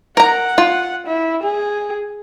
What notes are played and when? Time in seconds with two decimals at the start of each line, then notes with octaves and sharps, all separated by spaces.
0.17 A#4 F#5 A#5
0.58 F4
1.07 E4
1.43 G#4